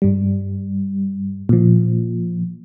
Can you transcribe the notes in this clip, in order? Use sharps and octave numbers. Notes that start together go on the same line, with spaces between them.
G2 G3
A#2 F3